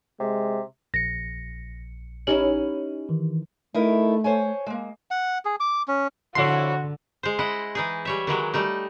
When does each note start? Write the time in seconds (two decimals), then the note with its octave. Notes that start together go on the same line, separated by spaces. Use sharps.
0.20 C3 G#3
0.94 A#1 A#6 C#7
2.27 C#4 D#4 E4 G4 F#7
3.09 D#3 E3
3.74 A3 D#4 E4 A#4
4.24 C5 C#5 G#5
4.66 G#3 A#3
5.11 F#5
5.45 G#4
5.60 D6
5.88 C#4
6.35 F2 D3 E4 F#4 C#5 C6
7.23 G#3 C5
7.39 E4 D#5 F#5
7.75 E3 D#4 G#4
8.05 G3 C#5 E5
8.27 D#3 E3 F#3 G#3
8.54 G3 A3 D#4